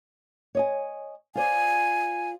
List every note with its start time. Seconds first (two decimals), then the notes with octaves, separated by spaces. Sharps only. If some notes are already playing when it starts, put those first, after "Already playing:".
0.55 C#5 D#5 G#5
1.36 F4 C5 D5 G#5